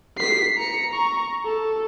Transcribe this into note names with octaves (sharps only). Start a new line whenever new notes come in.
B6 C7
A#5 C#7
A#5 C#6
A4